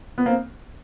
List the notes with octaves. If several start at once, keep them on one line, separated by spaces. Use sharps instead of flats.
B3
A#3 C4